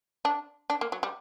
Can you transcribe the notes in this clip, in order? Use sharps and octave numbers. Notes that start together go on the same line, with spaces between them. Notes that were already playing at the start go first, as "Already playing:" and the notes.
D4
D4
A#3
F#3
G3